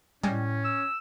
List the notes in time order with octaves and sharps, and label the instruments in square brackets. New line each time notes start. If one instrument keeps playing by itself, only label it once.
[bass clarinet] A2 [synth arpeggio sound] G3 G#3 G#4 [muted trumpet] C#4
[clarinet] E6